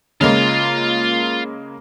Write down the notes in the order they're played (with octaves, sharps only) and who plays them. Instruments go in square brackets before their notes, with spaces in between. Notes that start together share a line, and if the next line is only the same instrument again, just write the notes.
[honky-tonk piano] C#3 G#3 A#3 [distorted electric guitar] F4 F5